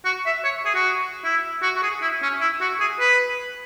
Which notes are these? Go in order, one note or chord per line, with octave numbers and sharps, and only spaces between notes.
F#4
E5
C#5
G#4
F#4
E4
F#4
F#4
G#4
E4
C#4
E4
F#4
G#4
B4